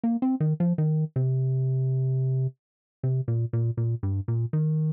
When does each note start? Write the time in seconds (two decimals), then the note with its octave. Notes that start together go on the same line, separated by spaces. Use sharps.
0.04 A#3
0.22 C4
0.40 D#3
0.60 F3
0.78 D#3
1.16 C3
3.03 C3
3.28 A#2
3.53 A#2
3.77 A#2
4.03 G2
4.28 A#2
4.53 D#3